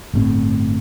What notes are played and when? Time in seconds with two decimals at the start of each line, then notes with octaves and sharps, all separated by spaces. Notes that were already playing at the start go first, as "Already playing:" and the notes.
0.14 G1 A2 C4